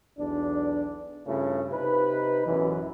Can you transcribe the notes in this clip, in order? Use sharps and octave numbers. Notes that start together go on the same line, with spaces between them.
B1 E2 D4
G2 C#3 A3 E4 F4
C3 D#4 B4
A1 F#2 B2 E3